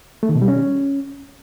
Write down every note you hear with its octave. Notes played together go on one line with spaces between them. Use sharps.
A3
D#3
B2
G3
C#4